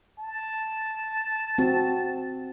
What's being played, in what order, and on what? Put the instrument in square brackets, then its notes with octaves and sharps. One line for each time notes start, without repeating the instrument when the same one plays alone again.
[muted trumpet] A5
[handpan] C4 F#4